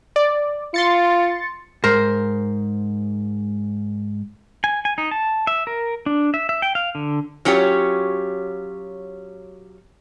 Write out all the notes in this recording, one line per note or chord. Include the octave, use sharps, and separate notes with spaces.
D5
F4 C6 A6 C#7
G#2 A#4 C5
G#5
G#5
D#4
A5
E5
A#4
D4
E5
E5
G5
F5
D3
F#3 C#4 F4 G4 C#5